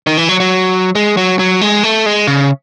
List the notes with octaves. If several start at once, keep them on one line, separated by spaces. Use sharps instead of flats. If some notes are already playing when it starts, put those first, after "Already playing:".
D#3
E3
F#3
F#3
G#3
F#3
F#3
G#3
A3
G#3
C#3